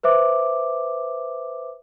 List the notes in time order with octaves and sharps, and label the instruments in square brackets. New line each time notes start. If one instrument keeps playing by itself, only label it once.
[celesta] B4 C5 E5 D6